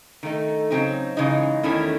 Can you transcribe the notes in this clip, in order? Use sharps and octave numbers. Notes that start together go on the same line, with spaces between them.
D#3 A3 D#4
C#3 F#3 C4 D#4
C#3 E3 G#3 D#4
E2 D#3 A3 C#4 E4